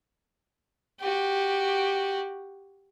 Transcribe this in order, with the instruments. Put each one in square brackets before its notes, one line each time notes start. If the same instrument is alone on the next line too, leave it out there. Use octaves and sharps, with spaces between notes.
[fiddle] F#4 G4